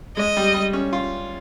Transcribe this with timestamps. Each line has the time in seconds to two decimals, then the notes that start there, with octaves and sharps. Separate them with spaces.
0.17 G#3 D#5
0.37 G3
0.54 G3
0.73 C#4
0.93 F4